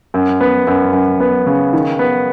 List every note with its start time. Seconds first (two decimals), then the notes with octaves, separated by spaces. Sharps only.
0.14 F#2
0.41 B3
0.67 F#2
0.93 F#2
1.20 B3
1.46 C#3
1.73 D#3
1.99 B3